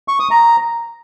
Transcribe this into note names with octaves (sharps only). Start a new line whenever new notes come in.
C#6
D#6
A#5